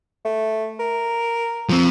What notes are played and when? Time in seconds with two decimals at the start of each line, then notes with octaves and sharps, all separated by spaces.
0.25 A3
0.79 A#4
1.69 F3 C4